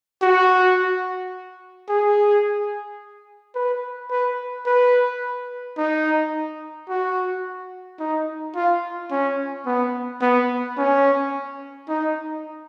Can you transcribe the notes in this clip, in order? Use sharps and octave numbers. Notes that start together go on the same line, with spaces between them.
F#4
G#4
B4
B4
B4
D#4
F#4
D#4
F4
C#4
B3
B3
C#4
D#4